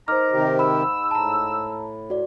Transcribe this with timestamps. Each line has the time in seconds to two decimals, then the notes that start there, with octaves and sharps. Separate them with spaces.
0.08 D#4 A#4 C5 A#5 D6 F6
0.32 C3 D#3 G4
0.59 G#2 B5 E6
1.11 A2 A5 A#5
2.10 F#4 D5